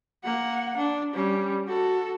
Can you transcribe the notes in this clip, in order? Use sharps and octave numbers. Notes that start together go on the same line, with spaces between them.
A#3 F#5
D4
G3 C#4
F#4 A4